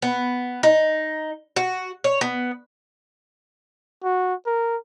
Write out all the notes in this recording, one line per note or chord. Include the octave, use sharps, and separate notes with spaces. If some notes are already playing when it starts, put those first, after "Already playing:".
B3
D#4
F#4
C#5
B3
F#4
A#4